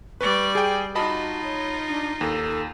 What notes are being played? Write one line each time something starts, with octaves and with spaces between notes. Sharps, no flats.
G3 B4 D5 C#6
G#4 G5 G#5
D#4 F4 F#4 D#5 A5 B5
C#5
D4
D#2 A4